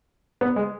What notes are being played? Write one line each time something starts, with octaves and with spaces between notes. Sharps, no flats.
B3
G#3